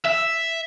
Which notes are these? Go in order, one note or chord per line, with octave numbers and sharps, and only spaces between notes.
E5